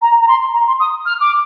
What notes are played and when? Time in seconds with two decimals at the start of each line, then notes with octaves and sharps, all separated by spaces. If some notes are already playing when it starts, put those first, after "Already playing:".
0.02 A#5
0.20 A#5
0.28 C6
0.53 A#5
0.67 C6
0.80 D#6
1.06 F6
1.21 D6